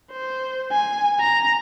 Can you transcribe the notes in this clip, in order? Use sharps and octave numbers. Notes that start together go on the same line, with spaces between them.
C5
G#5
A#5